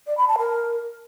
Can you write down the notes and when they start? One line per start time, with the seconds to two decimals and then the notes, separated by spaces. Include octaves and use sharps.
0.07 D5
0.18 B5
0.28 A5
0.39 A#4